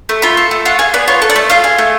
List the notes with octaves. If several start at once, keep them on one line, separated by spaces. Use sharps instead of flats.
A3
F4 B5
A4
A3
F4 F#5
G#4 F5
B3 D5
F4 C#5
A4
D5
A3
F4 F5
G#4
A3